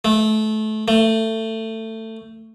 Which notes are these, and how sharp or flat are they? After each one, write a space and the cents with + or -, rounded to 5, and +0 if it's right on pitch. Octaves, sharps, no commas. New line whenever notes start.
A3 -25
A3 +20